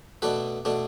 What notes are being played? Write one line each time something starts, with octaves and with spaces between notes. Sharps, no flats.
B2 A3 D4 B4
B2 A3 D4